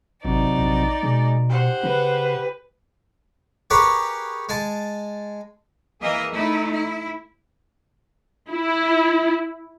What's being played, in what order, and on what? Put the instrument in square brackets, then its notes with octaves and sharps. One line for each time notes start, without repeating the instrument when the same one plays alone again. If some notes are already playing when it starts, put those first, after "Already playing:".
[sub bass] G#1 [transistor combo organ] C3 F#3 [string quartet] D#4 D5
[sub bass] A#1
[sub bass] B2 [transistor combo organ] G#3
[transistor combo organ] G4 [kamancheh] C5 F#5
[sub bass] C#3 [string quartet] B4
[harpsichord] G4 G#4 A#4 B4 C#5
G#3 G#5 A5
[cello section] E3 A#3 G#4 A#4 D#5 E5
A3 D#4 E4
E4
[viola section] E4